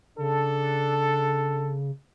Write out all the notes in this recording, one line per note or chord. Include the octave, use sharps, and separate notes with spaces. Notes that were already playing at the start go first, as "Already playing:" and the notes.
C#3 D4 A4